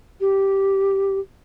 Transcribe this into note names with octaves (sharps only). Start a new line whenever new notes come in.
G4